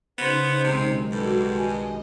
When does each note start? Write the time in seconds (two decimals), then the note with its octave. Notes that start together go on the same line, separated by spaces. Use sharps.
0.18 C#3 B3 D#4 C5
0.64 B1 C3 D#3 G#3
1.12 G2 F#4 A4 C6 D6
1.56 D#5 G#5